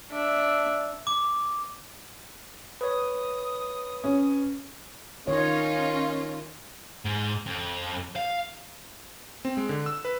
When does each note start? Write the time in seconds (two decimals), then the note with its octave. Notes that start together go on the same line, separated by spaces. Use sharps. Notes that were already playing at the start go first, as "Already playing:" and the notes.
0.11 D4 E5
1.07 D6
2.81 B4 C#5 D#6
4.04 C#4
5.27 D#3 C#4 D#4 F4 C#5 D#5
7.05 G#2
7.46 F2
8.16 F5
9.45 C4
9.57 G#3
9.69 D3
9.86 E6
10.05 B4